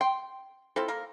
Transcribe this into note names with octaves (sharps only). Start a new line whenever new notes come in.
G5 C6
C4 E4 F4 A4
A#3 A#4